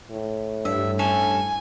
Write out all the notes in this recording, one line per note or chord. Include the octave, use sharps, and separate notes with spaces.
A2
G2 E5
C#4 A4 G#5